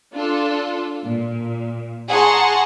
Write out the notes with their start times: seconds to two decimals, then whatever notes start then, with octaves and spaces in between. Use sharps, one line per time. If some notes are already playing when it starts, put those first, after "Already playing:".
0.14 D4 F4 A4
1.06 A#2
2.10 G#4 F#5 A5 A#5 C6 C#6